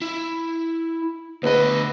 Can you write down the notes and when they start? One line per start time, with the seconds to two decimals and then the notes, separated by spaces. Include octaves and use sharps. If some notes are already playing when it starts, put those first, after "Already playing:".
0.02 E4
1.43 D2 B3 B4 D#5